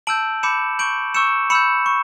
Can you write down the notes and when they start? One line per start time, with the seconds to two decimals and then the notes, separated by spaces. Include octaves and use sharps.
0.07 A5 E6 G6 D7 F#7
0.43 B5 D6 G6 C#7 E7
0.79 C#6 G6 D7 F#7
1.14 C#6 E6 G6 C#7 E7
1.50 B5 E6 G6 C#7 E7
1.86 C#6